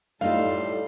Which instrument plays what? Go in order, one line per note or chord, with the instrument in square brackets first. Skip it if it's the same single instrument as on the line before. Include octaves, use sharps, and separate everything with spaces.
[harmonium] A2 G3 [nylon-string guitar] A3 D#4 F4 [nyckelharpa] A4 C6 [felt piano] F5